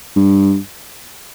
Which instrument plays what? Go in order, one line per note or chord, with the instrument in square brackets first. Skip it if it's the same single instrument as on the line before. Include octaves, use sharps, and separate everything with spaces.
[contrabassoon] G2